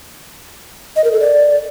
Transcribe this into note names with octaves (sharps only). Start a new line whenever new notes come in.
D#5
A#4
A4
D5